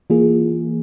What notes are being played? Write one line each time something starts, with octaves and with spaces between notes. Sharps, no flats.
E3 A#3 F4 G#4